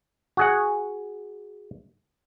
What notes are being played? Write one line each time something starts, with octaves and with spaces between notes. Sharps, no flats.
F#4 G#4 F#5